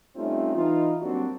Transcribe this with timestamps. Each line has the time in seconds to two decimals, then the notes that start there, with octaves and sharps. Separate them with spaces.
0.16 G3 A3 C4 C#4 D#4 F4
0.55 E3 D#4 F4
1.01 F#3 G3 A#3 C4 D4 F#4